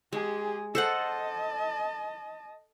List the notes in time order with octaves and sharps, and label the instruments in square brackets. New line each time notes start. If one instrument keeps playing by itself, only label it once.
[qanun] G#3 [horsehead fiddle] G4 G#4
[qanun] A4 C5 F#5 [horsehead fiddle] D#5 A5